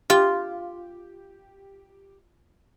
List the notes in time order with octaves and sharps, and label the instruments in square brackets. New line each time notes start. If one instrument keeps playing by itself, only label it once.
[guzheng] F4 [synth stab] G4